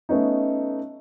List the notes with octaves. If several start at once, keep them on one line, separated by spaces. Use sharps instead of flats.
A3 B3 C#4 D#4